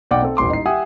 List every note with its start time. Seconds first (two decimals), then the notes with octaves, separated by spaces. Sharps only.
0.11 B1 D5 F#5 G5 D6
0.22 C4 A4
0.37 D#1 A1 C6 D6
0.50 D#4 C7
0.66 G4 E5 F#5 G#5 D#6